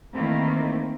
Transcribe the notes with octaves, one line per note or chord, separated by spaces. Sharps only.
D#3 E3 A3 A#3 C4 E4